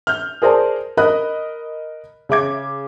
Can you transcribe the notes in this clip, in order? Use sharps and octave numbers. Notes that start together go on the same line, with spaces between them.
F6 G6
G#4 A#4 C5 D5 A5
A#4 D#5 B5 D#6 F#6
C#3 E5 D6 G#6